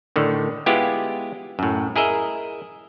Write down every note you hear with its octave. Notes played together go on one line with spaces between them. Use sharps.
A2 D3 D#3
G#3 B3 E4 F4 G4
F#2 A2
E4 G#4 A#4 D#5 E5